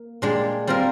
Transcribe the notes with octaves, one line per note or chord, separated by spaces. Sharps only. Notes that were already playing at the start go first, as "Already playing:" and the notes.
Already playing: A#3
A#2 G#3 D4 G4
G3 C4 F4 A#4